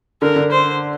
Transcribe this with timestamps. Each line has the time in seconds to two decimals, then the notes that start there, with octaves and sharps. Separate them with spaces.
0.22 D3 A#4
0.36 D3
0.51 C5